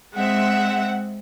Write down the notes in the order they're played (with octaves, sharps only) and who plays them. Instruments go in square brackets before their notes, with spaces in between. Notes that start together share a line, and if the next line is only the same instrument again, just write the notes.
[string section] G#3 C4 E5 [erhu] F#5